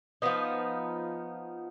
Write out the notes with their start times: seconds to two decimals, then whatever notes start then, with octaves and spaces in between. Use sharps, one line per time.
0.22 F3 B3 D#4